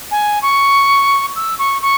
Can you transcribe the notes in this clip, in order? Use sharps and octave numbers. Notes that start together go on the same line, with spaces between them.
G#5
C#6
E6
C#6
C#6